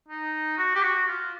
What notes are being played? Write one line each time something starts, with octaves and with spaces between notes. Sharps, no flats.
D#4
F#4
G4
F#4
F4